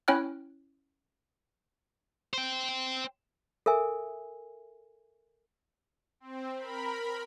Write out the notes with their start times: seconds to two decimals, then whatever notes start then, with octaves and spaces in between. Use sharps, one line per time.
0.08 C#4 E4 C#5 G5 F6 F#6
2.33 C5 G5
3.66 A4 A#4 E5 G#5
6.20 C4
6.57 A#4 B5